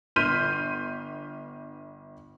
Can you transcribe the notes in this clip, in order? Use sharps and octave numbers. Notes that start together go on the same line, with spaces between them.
G1 C6 F6 G6 B6 D#7